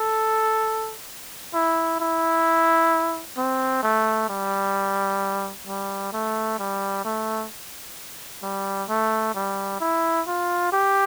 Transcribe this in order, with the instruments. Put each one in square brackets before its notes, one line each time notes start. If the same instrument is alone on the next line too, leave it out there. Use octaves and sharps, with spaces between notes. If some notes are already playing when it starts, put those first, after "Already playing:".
Already playing: [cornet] A4
E4
E4
C4
A3
G3
G3
A3
G3
A3
G3
A3
G3
E4
F4
G4